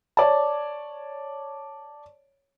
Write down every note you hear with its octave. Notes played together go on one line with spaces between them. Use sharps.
C#5 D5 A5